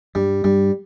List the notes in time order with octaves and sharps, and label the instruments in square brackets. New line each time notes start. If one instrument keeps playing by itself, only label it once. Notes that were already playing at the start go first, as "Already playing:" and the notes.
[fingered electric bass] G2 [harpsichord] G3
[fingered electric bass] G2 [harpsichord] G3